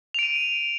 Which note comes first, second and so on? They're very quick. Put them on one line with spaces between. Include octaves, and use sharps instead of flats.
F7 D7 D#7